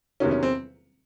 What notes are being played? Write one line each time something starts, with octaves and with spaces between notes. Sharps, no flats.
E2 C3 D#3 F#3 C#4
C#4
C4